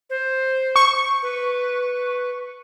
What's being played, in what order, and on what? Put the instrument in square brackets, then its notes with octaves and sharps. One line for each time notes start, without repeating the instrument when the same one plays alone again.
[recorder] C5
[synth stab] C#6
[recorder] B4